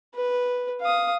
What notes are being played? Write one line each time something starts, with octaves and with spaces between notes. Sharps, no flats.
B4
F5 D#6